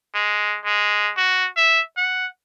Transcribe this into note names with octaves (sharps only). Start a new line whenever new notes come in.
G#3
G#3
F#4
E5
F#5